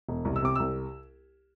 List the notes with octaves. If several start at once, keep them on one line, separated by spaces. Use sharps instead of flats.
E1
C2
E6
C3 D6
C2 E6